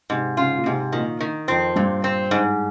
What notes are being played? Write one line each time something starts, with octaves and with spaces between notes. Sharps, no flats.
G#2 C3
C#3 F4
A#2
G#2 C3
A#2 D#3
D#3
F2 C4
G2 A#2
C4
G#2